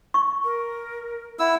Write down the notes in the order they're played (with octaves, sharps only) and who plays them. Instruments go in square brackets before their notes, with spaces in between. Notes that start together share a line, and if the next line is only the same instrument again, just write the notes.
[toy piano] C#6
[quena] A#4
[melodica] E4 E6 [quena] F#5